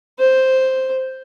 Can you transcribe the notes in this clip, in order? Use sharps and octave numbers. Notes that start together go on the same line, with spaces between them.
C5